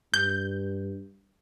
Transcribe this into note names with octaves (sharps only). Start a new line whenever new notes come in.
G2 G6